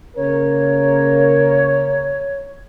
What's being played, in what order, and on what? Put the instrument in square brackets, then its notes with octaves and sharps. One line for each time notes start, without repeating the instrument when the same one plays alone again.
[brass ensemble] C#3 A#3 A#4 [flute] C#5